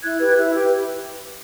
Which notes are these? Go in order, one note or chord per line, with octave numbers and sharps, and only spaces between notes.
E4 F#6 G#6
G4 B4
E4
G4 B4